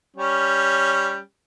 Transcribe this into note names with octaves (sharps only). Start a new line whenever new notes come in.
G3 C#4